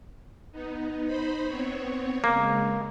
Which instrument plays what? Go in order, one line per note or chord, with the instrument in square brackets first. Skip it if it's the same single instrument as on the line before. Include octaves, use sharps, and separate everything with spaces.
[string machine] B3 D#4
D#4 C5 B5
B3 C4 C#5
[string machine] C#3 G#3 [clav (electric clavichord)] A#3